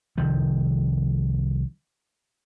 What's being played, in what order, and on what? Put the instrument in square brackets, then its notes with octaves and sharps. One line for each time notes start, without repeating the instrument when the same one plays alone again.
[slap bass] C2 D#3 F3